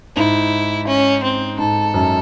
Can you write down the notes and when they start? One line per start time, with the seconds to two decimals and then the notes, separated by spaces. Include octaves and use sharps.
0.16 G#2 E4
0.87 C#4
1.23 C4
1.59 G#2 A4
1.94 F#2